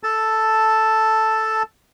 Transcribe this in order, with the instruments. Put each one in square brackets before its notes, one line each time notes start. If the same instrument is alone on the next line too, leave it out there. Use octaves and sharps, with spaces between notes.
[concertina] A4 A5